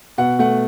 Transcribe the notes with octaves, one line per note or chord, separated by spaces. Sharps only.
B2 F#5
A3 F#5